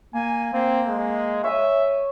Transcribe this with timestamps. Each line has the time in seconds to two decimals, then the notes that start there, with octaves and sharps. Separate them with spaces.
0.14 A#3 G#5
0.53 A#3 C4
0.88 G#3
1.44 C#5 E5 G#5